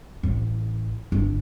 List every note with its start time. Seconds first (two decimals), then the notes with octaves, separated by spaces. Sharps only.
0.23 A1
1.12 G1